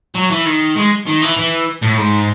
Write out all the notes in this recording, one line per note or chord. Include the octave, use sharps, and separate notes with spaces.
F#3
E3
D#3
G#3
D#3
E3
E3
A2
G#2